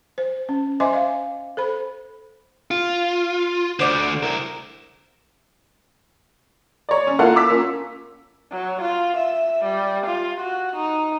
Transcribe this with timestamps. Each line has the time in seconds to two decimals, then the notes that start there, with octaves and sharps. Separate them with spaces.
0.18 C5
0.49 C#4
0.80 C5 D#5 E5 G#5 C6 D6
0.93 D#5 F5
1.57 A4 C5 B5
2.71 F4
3.79 D2 D3 C5 D5
4.23 E4 A#4
6.89 C#5 D5
7.07 C#4
7.19 A#3 E4 F4 A4 F5 F#5
7.36 D6 E6 B6
7.50 A#3 C#4 F4
8.52 F#3
8.82 F4
9.17 E5
9.64 G3
10.06 F4
10.41 F#4
10.76 D#4